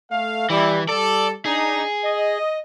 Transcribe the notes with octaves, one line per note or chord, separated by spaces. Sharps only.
A3 F5
E3 G3 E4
G3 A4 D5
D4 D#4 G#4
D#5